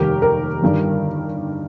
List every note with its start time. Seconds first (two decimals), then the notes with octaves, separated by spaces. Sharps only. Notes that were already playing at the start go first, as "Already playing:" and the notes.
Already playing: F1 D#2 D#3 G3 G4 A#4
0.22 G4 A#4
0.62 G1 G2 D#3 G3